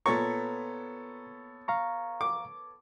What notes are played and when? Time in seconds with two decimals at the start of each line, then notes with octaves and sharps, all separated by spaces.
0.06 A#2 B3 A4 C#5 A#5 C#6
1.68 F5 A#5 C#6
2.21 D6